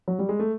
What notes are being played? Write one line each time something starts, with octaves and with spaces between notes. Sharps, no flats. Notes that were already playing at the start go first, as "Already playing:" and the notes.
F#3
G3
G#3
A3